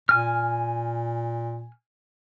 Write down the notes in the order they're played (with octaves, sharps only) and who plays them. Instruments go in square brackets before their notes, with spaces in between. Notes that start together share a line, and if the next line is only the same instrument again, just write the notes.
[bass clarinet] A#2 [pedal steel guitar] G#5 F6